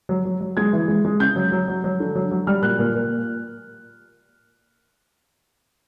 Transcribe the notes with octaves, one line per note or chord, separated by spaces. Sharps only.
F#3
F#3
F#3
G#3 G#6
E3
G#3
G#3
C#3 G6
F#3
F#3
F#3
F#3
D3
F#3
F#3
G3 F6
A#2 F#6
A#2
A#2